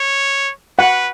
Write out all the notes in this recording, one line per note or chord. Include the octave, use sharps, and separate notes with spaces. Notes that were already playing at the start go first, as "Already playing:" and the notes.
Already playing: C#5
B4 F#5